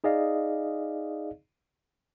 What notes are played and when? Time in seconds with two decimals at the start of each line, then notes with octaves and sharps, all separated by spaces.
0.04 D#4 G#4 D5 D#5 F5